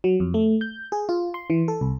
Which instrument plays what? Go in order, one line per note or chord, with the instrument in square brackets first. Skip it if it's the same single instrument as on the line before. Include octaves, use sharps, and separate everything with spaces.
[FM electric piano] F#3
F2
A3
G6
G#4
F4
C6
E3
A4
C2